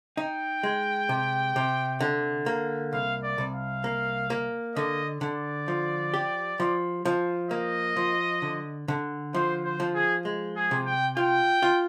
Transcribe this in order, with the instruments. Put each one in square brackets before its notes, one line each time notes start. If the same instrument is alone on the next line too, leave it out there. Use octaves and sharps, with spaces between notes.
[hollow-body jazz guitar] D#4 [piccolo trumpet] G5
[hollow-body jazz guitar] G#3
C3
C3
D3
A#3
[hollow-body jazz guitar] C2 [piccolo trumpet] F5
[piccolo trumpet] D5
[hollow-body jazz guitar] C2
[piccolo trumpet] F5
[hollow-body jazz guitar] A#3
A#3
[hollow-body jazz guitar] D3 [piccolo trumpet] D#5
[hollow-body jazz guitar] D3 [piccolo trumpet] D5
[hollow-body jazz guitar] F3
G4
F3
F3
[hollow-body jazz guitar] A#3 [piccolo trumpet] D#5
[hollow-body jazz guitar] F3
D3
D3
[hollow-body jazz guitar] F3 [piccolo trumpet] C5
[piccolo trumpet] C5
[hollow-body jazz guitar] F3
[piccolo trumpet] G#4
[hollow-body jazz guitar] G#3
[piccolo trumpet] G#4
[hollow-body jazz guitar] C3
[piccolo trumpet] G5
[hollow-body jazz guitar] F4 [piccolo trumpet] G5
[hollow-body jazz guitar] F4